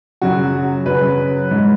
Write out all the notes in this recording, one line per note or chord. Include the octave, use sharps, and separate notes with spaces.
F#2 C#3 F#3 F#4
F#2 C#3 F#3 B4
G#2 G#3